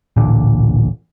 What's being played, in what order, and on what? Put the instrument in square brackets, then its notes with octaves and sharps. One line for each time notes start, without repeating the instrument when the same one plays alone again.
[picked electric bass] D1 A1 A#2 D3